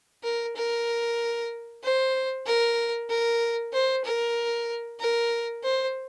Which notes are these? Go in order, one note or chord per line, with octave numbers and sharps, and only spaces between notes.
A#4
A#4
C5
A#4
A#4
C5
A#4
A#4
C5